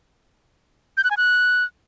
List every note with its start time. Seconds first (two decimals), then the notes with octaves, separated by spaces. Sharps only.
0.97 G6
1.04 F#6
1.11 G#5
1.17 F#6